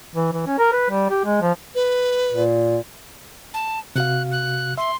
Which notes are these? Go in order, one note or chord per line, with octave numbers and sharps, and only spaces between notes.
E3
E3
C#4
A#4
B4
G3
G4
G#3
F3
B4
A#2
A5
C3 F#4 F5 F#6
F#6
E5 C6